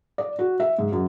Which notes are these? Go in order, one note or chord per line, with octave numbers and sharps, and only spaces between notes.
D5
F#4
E5
G#2
F#2